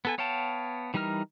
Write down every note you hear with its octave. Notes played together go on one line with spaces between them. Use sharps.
B3 A4 G#5
B3 C#5 F5 G5 A5
E3 G3 D#4 A#4 F6